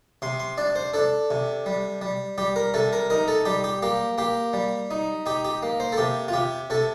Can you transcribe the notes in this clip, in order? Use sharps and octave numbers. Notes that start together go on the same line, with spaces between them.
C3 C6
C6
D4 D5
C5
D4 A4
C3
G3
G3
G3 G4
A#4
C3 A4
A#4
D#4 A#4
A4
G3 G4
G4
A#3 G4
A#3 G4
G3
D#4
D#4 G4
G4
A#3
C5
A4
C3 G4
F4
C3 G4
C3 A4